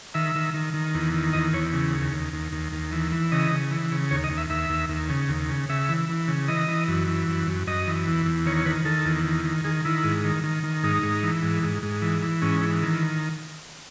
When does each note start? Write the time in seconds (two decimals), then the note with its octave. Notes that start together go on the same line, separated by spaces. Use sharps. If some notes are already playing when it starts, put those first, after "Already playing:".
0.14 D#3 E5
0.35 D#3
0.54 D#3
0.74 D#3
0.95 E2
1.14 D#3
1.33 E2 D#5
1.53 E2 C#5
1.73 C#3
1.94 D#2
2.13 D#2
2.33 D#2
2.52 D#2
2.72 D#2
2.92 E3
3.12 E3
3.32 C#3 D#5
3.51 C#3
3.71 E3
3.91 C#3
4.11 D#2 C#5
4.24 D#5
4.30 D#2
4.38 E5
4.50 D#2 E5
4.70 D#2
4.89 D#2
5.09 C#3
5.29 D#2
5.49 C#3
5.69 C#3 E5
5.89 E3
6.09 E3
6.28 C#3
6.48 E3 D#5
6.68 E3
6.88 F#2
7.08 E3
7.28 F#2
7.47 F#2
7.67 F#2 D#5
7.87 E3
8.07 E2
8.26 E2
8.46 D#3 C#5
8.57 C#5
8.66 D#3 B4
8.85 D#3 A4
9.05 E2
9.25 D#3
9.45 D#3
9.64 D#3 G#4
9.85 D#3 E4
10.04 G#2
10.24 D#3
10.44 D#3
10.64 D#3
10.83 G#2 D#4
11.03 G#2
11.23 E3
11.42 G#2
11.63 G#2
11.83 G#2
12.02 E3
12.22 E3
12.42 G#2 C#4
12.61 E3
12.82 D#3